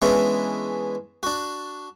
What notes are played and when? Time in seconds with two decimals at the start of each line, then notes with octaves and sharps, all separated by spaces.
0.02 E3 G#3 B3 C#4 D4 E4
1.23 D4 F#4